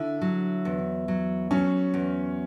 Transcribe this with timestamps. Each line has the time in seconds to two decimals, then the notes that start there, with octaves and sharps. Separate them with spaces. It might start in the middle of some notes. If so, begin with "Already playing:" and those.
Already playing: D3 E4
0.21 F#3
0.65 E2
1.08 F#3
1.51 F#3 C#4
1.94 E2